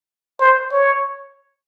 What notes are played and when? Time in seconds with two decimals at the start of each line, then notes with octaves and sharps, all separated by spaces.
0.40 C5
0.72 C#5